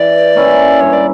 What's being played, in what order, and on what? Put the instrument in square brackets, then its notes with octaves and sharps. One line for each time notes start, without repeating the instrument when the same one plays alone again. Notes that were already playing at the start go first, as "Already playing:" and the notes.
Already playing: [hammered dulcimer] E3 [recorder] D5
[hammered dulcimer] A#3 C#4 E4
[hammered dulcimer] G2 [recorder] C#5
[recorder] D5